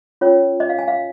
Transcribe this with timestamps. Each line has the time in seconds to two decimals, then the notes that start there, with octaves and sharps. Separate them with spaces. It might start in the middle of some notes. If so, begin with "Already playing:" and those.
0.21 C#4 F4 A#4 C#5
0.60 D#5
0.69 F5
0.79 G#5
0.88 F5